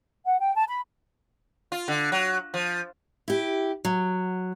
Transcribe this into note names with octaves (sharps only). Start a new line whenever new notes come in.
F#5
G5
A5
B5
F4
D3
F#3
F3
E4 G4
F#3